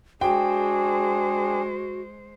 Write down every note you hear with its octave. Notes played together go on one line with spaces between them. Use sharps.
G#3 D4 F#4 G#4 C5 G5